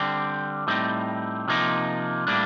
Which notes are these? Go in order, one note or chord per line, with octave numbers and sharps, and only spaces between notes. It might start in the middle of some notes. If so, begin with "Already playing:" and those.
Already playing: D3 G3 C4
A2 G3 C4 D#4
C3 F3 A#3 D#4
A2 G3 A#3 D4